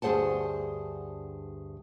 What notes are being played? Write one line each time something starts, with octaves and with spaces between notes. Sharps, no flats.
D2 G2 G#4 C5 F#5 A5